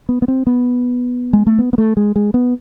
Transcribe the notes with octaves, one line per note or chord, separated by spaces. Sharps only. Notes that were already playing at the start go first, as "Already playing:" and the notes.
B3
B3
C4
B3
G#3
A3
B3
B3
A3
G#3
G#3
B3